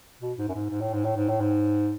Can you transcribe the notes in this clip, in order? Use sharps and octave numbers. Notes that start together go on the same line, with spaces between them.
B2
G#2
F#2
G#2
G#2
A2
G#2
A2
G#2
A2
G#2